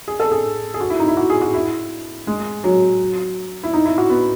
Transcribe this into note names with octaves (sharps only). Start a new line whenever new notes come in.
G#4
A4
G#4
G#4
F#4
E4
D#4
E4
F#4
G#4
F#4
E4
G#3
F#3
E4
D#4
E4
F#4
B3